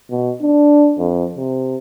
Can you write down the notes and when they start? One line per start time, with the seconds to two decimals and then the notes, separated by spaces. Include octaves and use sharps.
0.11 B2
0.42 D4
0.99 F2
1.37 C3